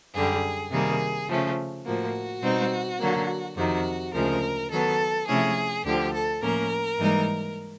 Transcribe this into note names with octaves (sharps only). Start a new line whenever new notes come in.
F#2 D3 G3 G#4
C3 D#3 G3 A#3 G#4
C#3 F3 A3 C#4
A2 F3 A#3 F#4
B2 G3 C4 D#4
D3 F#3 A#3
F2 C3 D#3 F#4
D2 C#3 F3 G#3 A#4
D#3 F#3 B3 A4
C3 F3 A3 C#4 E4 G#4
D2 D3 F3 G4
A4
A2 F3 A#3 C#4 A#4
G#2 E3 G3 A#3 D#4